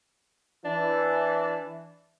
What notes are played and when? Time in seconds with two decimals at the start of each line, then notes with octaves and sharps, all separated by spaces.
0.65 E3 D4